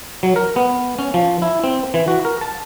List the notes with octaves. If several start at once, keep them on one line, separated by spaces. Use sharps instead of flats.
F#3
A#4
B3
C#4
F3
E4
C4
E3
F#4
A#4
A5